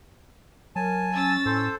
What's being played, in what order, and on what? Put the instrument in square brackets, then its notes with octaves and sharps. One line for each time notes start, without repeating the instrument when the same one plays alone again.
[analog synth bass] F#3 [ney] A#4 [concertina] G#5 A5
[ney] C#4 [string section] E6 A6
[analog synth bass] A2 [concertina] A4 C5